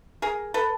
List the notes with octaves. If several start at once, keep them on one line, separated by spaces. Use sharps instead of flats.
G#4 A#4
A4 B4